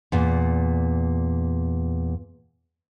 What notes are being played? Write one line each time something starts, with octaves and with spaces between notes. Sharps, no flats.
E2 A#2